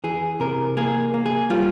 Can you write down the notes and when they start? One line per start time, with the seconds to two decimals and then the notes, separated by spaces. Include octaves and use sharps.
0.04 E3 G#4
0.40 C3 A#4
0.77 A#3 G#4
1.14 A#3
1.26 G#4
1.50 G3 F4